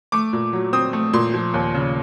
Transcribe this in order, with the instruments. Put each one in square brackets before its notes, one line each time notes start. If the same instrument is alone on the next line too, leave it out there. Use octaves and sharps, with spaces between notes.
[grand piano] A3 D6
A#2
F#3
C4 D#6
A3
A#2 C6
F3
D#2
C#3